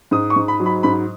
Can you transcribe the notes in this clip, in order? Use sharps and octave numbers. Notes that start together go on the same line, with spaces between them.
G#2 D#6
C#6
G#2
B5
F#3
B5
G#2 B5